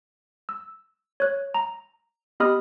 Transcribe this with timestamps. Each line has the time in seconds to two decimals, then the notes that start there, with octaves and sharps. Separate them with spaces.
0.49 E6
1.20 C#5 F#6
1.54 A#5
2.40 B3 G4 D#5 B5 D#6 F6